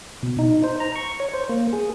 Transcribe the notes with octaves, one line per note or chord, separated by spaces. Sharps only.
B2
D#4
C5
A#5
C#6
C#5
C5
A#3
G#4